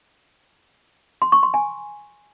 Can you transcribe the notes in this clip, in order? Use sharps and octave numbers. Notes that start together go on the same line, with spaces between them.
C6
C#6
C6
G#5